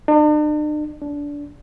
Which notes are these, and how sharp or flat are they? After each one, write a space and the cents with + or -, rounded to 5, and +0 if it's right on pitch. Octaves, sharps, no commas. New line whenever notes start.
D4 +45
D4 -20